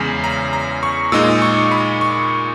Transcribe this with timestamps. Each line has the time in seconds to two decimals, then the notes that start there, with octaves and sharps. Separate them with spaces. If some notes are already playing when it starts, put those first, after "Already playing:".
Already playing: E2 C#3 G#3 G#5
0.24 A#5
0.53 A#5
0.83 C#6
1.12 A#2 G#3 D#4 E6
1.42 C#6
1.71 B5
2.01 C#6